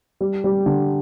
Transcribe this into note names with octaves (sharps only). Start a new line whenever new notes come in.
G3
G3
D3